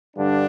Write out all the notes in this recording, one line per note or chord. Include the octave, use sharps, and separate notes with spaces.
G2 D3 D4